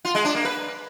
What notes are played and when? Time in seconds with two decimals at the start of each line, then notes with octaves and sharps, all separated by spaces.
0.05 F4
0.15 G#3
0.25 D4
0.35 A#3
0.45 B4